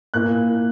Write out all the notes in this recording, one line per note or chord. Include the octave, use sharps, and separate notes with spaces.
A#2 A#3 E4 F#6